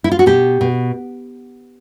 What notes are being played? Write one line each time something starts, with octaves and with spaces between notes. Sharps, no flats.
E4
F4
F#4
B2 G4
B2